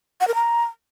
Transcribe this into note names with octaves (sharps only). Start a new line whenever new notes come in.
F#5
A#4
A#5